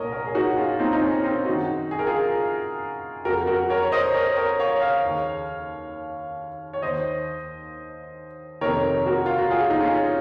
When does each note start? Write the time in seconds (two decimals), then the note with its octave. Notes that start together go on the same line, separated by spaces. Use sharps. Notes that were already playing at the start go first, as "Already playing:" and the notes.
Already playing: C2 A#2 A#4 C#5 D#5
0.12 A#4 C#5
0.27 G#4
0.35 D#4 F#4
0.57 C#4 F4
0.79 C4 D#4
0.93 D#4
1.02 C#4
1.24 C4 D#4
1.46 F#2 D#3 D#4 F#4
1.91 G#4
1.99 A#4
2.07 F4 G#4
3.25 F2 C#3 F#4 A#4
3.47 F#4 A#4
3.70 A#4 C#5
3.82 C#5
3.92 C5 D#5
4.14 A#4 C#5
4.37 A#4 C#5
4.59 C#5 F5
4.81 C#5 F5
5.04 D#2 C#3
6.73 C#5
6.82 D#2 D#3 C5 D#5
8.61 F2 C3 D#3 A#4 C#5
9.06 F#4 A#4
9.26 F4
9.38 F#4
9.50 F4 G#4
9.70 D#4
9.81 C#4 F4